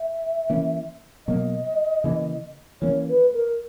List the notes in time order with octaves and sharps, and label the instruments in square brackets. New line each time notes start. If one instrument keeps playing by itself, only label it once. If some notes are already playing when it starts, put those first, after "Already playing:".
Already playing: [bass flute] E5
[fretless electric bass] E3 A#3 C#4
[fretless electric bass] B2 F#3 A#3 [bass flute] D#5
[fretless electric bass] C#3 E3 A#3
[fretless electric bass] E3 A#3 C#4 [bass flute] C#5
[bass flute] B4
A#4